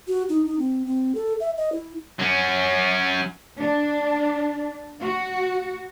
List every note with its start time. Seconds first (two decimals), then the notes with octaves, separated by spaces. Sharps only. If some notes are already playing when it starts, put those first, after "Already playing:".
0.08 F#4
0.29 D#4
0.46 D#4
0.59 C4
0.85 C4
1.15 A4
1.40 E5
1.57 D#5
1.72 E4
2.19 F#3 C#4
3.58 D4
5.02 F#4